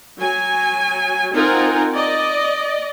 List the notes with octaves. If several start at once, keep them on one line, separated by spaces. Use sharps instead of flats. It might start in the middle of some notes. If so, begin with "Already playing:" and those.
F#3 G#5
C4 D#4 F4 A#4 F#5 G#5
D5 D#5